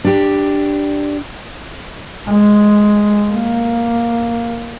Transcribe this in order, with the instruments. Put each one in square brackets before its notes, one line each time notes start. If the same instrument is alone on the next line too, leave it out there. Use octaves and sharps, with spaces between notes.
[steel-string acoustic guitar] D4 G4
[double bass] G#3
A#3